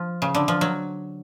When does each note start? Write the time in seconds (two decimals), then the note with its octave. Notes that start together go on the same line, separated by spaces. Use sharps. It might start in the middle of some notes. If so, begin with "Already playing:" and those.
Already playing: F3
0.22 C#3
0.35 D3
0.48 F3
0.61 F#3